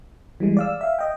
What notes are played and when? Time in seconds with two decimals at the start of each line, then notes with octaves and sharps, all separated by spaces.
0.40 E3 G3 G#3
0.57 D5 F5 E6
0.81 E5 F5
0.99 D#5 G5